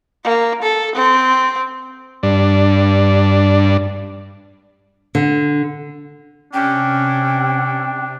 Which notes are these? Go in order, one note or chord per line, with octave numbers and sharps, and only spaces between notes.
A#3
A4
C4
G2 D4
D3
C3 C#4 D4 G5